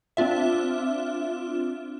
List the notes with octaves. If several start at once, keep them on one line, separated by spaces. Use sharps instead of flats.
C4 D4 F4 E5